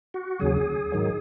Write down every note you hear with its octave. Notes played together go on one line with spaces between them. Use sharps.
F#4
D#2 C#3 F#3 G#4
G#2 D#3 F#3